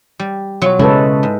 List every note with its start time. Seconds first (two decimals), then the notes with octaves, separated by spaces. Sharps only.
0.19 G3
0.62 B2 F#3 F4 C#5
0.79 C#3 G#3 E4 A4 B4
1.23 G#2